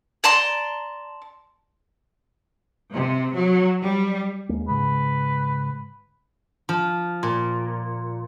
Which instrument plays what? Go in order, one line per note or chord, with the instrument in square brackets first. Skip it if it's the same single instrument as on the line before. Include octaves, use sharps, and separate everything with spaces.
[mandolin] D5 A5 A#5 C6
[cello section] C3
F#3
G3
[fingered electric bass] D#2 G#3 A#3
[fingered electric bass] G#2 C#3 G#3 [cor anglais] B4
[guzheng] F3
A#2